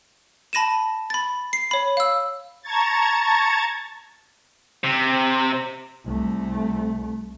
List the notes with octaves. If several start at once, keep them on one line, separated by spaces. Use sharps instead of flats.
A5 B5 A#6 D#7 E7
B5 A6
C7
C#5 B5
F5 E6
A5 A#5 C#6 G#6 A6
C3
C2 A3